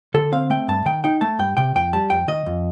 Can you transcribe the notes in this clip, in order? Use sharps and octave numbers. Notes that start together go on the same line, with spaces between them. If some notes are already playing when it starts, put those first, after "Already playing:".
D3 A4
C4 F5
A3 G5
G2 A5
D#3 G5
D#4 G5
A3 A5
G2 G5
C3 G5
F2 G5
G3 A5
F2 G5
D#3 D#5
F2